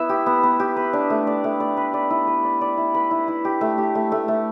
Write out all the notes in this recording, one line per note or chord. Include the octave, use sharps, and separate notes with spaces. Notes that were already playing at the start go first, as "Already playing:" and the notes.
Already playing: B3 E4 E5
G4
B3
B3
G4
B4
D4
A3
D5
A3
D5
B4
D5
E4
B4
D5
D5
E4
B4
E4
E4
G4
A3
G4
A3
A3
A3